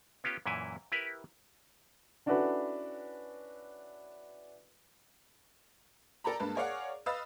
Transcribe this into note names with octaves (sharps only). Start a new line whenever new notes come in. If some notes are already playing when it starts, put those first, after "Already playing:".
B3 C#4 F4 G4
F#2 A#2 E3 E4 G#5
E4 G4 A#4 B4
C#4 D4 E4 F#4 A4 B4
A4 A#4 D5 G5 A#5 B5
G2 G#3 A#3 B4 A5
G#4 A#4 C#5 D5 F5 F#5
B4 D#5 F5 D#6 E6 A6